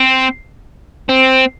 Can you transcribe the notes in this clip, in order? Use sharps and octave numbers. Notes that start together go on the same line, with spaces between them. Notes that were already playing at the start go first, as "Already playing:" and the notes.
Already playing: C4
C4